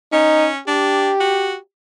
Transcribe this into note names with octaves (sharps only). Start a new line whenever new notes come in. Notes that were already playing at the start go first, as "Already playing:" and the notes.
C#4 D#4
D4 G4
F#4